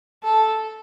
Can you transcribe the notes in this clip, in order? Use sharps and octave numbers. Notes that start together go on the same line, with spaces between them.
A4